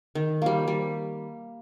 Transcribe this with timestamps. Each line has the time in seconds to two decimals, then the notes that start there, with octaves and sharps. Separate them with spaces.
0.15 D#3
0.42 G3 A#3
0.68 G3